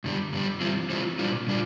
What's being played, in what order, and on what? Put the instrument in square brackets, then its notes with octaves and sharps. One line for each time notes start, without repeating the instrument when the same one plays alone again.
[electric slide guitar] G2 D3 G3
G2 D3 G3
E3 G3 C4 F4
E3 G3 C4 F4
A#2 G3 D4 F4
A#2 G3 D4 F4